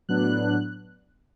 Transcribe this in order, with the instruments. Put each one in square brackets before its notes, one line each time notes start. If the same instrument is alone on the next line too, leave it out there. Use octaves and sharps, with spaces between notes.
[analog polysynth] A2 F#3 B3 D4 F#6